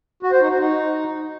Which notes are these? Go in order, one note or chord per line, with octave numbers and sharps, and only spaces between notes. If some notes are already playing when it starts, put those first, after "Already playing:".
F#4
C5
D#4
F#4
D#4